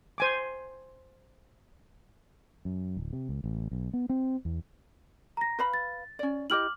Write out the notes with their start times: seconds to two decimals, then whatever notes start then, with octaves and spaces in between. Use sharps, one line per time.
0.18 C5 G#5 D6
2.65 F#2
2.97 D1
3.13 C3
3.29 C#2
3.44 A1
3.71 B1
3.93 B3
4.09 C4
4.45 E2
5.37 A#5 A#6
5.59 B4 F5 B5
5.74 A6
6.19 C#4 D5
6.50 E4 G4 D#5 D6 F6 F#7